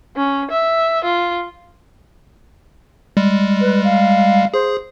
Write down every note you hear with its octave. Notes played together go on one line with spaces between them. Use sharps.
C#4
E5
F4
G3 G#3
B4
F5
G#4 C5